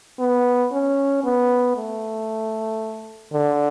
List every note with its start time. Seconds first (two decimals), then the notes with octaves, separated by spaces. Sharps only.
0.19 B3
0.72 C#4
1.24 B3
1.76 A3
3.33 D3